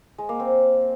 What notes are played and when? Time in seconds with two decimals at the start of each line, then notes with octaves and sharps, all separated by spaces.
0.18 G#3
0.29 A#3
0.40 C4